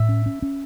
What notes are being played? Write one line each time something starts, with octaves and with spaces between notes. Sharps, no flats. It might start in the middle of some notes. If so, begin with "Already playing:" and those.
Already playing: A2 E5
C#4
C#4
C#4